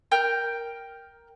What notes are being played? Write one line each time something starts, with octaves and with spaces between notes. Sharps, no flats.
A#4 G5 F6 G6